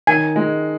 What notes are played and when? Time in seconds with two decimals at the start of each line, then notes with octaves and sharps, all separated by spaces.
0.07 D#3 G#5
0.36 G#3